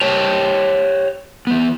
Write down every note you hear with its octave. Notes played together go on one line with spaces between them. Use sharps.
G4 C5 C#5 G5 A5
E3 B3